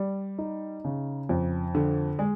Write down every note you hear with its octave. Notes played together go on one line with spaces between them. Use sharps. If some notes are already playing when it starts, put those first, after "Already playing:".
Already playing: G3
D#4
C#3
F2
D3
G#3